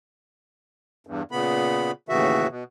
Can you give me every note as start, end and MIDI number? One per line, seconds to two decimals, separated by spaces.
1.07 1.23 40
1.07 1.23 43
1.31 1.91 46
1.31 1.91 49
1.31 1.91 59
1.31 1.91 83
2.09 2.47 39
2.09 2.47 45
2.09 2.47 49
2.09 2.47 52
2.09 2.47 66
2.09 2.47 76
2.50 2.64 47